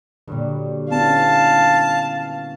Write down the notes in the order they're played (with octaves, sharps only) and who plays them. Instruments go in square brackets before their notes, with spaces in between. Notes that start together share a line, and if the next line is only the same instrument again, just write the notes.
[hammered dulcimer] G2 F#3 G3 [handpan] A#2 D3
[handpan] B3 C#4 E4 [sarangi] F5 [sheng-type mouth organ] A5